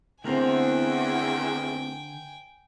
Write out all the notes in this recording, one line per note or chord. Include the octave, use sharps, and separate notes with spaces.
E2 D3 A3 C4 A#4 C5 G5 G#5